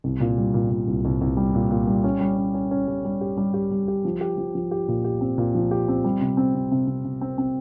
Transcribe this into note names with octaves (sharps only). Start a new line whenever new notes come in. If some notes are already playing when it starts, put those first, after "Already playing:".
C2
A#2
G3
A#2
A#2
C2
C2
C2
G3
A#2
A#2
G3
C#4
G3
C#4
C#4
C#4
G3
G3
G4
G3
G4
G3
G4
F3
G4
F3
F3
G4
A#2
G4
C4
A#2
F3
G4
C4
G3
C3
C4
C3
C3
C3
C3
C4
C4